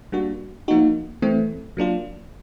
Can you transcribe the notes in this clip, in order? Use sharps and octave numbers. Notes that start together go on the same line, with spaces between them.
G3 A#3 D4 F#4
F3 A#3 D#4 F#4
E3 A3 C4
F#3 A#3 D4 F4